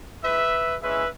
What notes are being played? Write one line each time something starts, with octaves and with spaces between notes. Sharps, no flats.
G#3 E4 B4 E5
G#3 C#4 E4 B4 E5